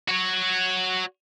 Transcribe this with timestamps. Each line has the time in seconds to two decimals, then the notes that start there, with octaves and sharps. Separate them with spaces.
0.08 F#4 C#5